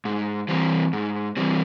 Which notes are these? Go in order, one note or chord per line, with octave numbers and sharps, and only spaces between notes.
G#2
E3 G3 C4
G#2
E3 G3 C4